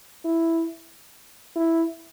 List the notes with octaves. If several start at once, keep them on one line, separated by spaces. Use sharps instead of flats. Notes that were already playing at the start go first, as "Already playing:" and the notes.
E4
E4